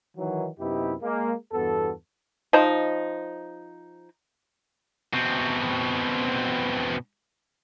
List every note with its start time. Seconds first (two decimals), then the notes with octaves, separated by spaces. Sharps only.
0.17 D#3 E3 F#3
0.58 F#2 C3 B3 D#4 E4 G4
1.02 G#3 A#3
1.53 E2 G2 B3 F#4 A4
2.53 F3 D#4
5.14 B2 C4